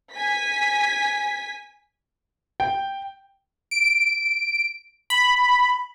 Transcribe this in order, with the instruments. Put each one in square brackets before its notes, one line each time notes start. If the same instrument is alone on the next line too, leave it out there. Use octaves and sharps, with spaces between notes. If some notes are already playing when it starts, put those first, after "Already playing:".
[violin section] G#5 B6
[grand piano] G5
[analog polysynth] D7
B5